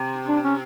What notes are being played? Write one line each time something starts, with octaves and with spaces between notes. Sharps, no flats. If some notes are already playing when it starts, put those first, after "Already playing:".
Already playing: C3
D4
C#4